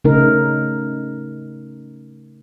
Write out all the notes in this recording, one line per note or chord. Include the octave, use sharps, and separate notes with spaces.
C#3 A3 D#4 A#4